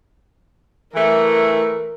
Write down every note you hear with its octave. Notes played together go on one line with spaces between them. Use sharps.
E3 A3 A#4